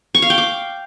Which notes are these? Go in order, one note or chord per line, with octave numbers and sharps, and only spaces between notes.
C#6
F5
G5
D6